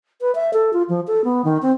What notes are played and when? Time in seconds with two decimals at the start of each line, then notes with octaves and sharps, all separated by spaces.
0.21 B4
0.35 E5
0.53 A4
0.73 F4
0.89 F3
1.07 A4
1.24 B3
1.45 D#3
1.62 C4